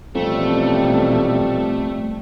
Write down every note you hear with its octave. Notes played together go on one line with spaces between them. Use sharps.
A1 F2 B2 G3 A3